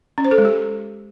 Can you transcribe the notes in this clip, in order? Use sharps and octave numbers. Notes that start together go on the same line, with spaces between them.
C#4
C5
A4
G#3
G4